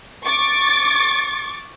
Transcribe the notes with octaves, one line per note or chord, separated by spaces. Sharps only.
C#6 D6 A6